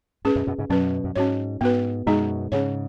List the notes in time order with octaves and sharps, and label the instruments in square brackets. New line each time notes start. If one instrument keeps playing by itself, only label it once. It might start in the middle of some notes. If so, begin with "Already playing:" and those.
[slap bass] G#2 [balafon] C#4 G#4 B4
[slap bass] F#2 B2
F#2 B2
G#2 C#3
[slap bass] F#2 B2 [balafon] F#3 C#4 B4
[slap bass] F#2
[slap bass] G#2 [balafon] C#4 F#4 C#5
[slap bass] G#2 [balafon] B3 F#4 B4
[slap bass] F#2 B2 [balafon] G#3 D#4 G#4
[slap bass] G#2 C#3 [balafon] C#4 G#4 C#5